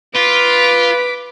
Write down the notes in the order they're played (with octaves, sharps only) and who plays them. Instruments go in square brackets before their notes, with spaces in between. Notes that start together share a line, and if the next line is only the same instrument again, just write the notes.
[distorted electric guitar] F4 [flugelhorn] B4 [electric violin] D6 B6